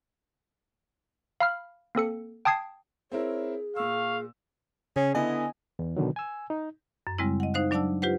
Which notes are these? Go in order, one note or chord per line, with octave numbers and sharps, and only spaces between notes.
F5 B5 F6
A#3 C4 A4 C#7
G5 A5 D#6 G#6 C7
C4 E4 G#4 A#4 C#5
A#2 F5 C#6 E6
C#3 C#4 G#4
D3 B3 E4 D#5 G#5
E2
B2 D3 D#3 F#3
G#5 E6
D#4
F#2
C#3 G3 G#3 C4 E4
D#5 F#5
D#4 C5 F5 F#6
F#3 D4 D5 F#5 A5 E6
F4 G4 B4 C5 F#5